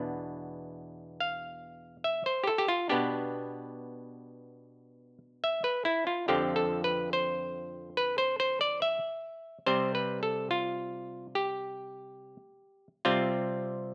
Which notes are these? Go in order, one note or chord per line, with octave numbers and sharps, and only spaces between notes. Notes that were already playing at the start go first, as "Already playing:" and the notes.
Already playing: E2 B2 B3 D4
F5
E5
C5
G4
A4
G4
F4
B2 B3 D4 G4
E5
B4
E4
F4
F2 D3 F3 C4 G4
A4
B4
C5
B4
C5
C5
D5
E5
C3 G3 C4 C5
B4
A4
F4
G4
C3 G3 C4 F4